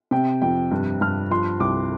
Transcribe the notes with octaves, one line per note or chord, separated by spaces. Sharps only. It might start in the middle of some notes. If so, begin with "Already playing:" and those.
C3 G5
F2 G5
G2
G2 F6
F3 C6
C2 D6